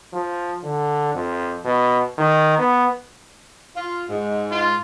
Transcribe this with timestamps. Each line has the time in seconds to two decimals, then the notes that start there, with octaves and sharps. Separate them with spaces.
0.13 F3
0.63 D3
1.14 F2
1.64 B2
2.18 D#3
2.58 B3
3.76 F4
4.09 G#2
4.51 F4